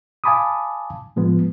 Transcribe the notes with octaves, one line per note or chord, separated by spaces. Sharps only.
F5 G#5 A5 B5 D6 D#6
A2 F3 G#3 B3